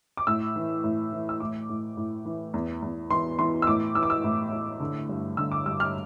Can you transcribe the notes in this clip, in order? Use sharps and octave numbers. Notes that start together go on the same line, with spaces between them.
D6
A2 E6
E3
A2
E3
E6
A2 D6
A2
A2
E3
E2
E2
E3 C6
E3 C6
E6
A2 D6
E3 E6
D6
E6
A2
A2
D3
G2
D3 E6
D6
G2 E6
F6